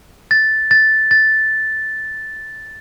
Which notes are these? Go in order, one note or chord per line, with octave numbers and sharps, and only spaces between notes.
A6
A6
A6